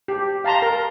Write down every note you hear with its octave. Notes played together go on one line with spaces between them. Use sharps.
G4
F5 A5 A#5 C6
A#4